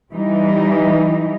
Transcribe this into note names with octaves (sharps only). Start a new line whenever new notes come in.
E3 G3 D#4